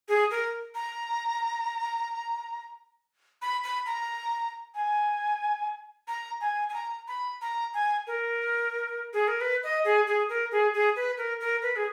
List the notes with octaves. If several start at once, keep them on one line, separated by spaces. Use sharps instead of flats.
G#4
A#4
A#5
B5
B5
A#5
G#5
A#5
G#5
G#5
A#5
B5
A#5
G#5
A#4
G#4
A#4
B4
D#5
G#4
G#4
A#4
G#4
G#4
B4
A#4
A#4
B4
G#4